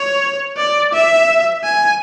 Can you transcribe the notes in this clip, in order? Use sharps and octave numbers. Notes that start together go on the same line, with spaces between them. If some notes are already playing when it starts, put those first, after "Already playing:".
Already playing: C#5
D5
E5
G#5